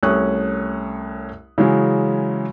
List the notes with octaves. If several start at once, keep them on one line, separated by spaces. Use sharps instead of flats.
C2 A3 C#4 C#6 D#6 F#6
C#3 E3 F#3 G#3 C#4